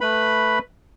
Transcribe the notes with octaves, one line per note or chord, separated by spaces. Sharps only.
A3 B4 B5